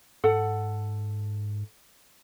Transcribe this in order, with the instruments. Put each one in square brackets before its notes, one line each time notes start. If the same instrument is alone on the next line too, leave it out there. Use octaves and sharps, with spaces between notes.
[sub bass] G#2 [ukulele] A4 F#5